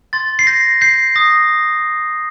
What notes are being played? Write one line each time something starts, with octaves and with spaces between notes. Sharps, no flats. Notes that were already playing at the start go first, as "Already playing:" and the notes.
C6 A6
C7
G6 A#6
G6 C7
D#6 A#6